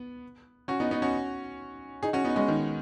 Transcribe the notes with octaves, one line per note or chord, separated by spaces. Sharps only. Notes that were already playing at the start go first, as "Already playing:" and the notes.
Already playing: B3
C#4 F#4
B3 D#4
B3 D#4
C#4 F#4
D#4 G#4
C#4 F#4
B3 D#4
G#3 C#4
D#3